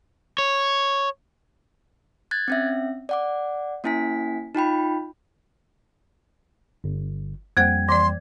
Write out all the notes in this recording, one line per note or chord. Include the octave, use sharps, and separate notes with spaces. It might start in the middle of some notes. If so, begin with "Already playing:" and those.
C#5
F#6 G#6 A6
C4 C#4 E5
D5 F#5 D6
A#3 C#4 E4 G#5 B6
D#4 F4 G5 B5
G1
F2 G3 A#3 C5 F#5 G5 G#6
E3 D5 C6